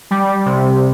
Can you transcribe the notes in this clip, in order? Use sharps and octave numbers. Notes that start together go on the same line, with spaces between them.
G3
C3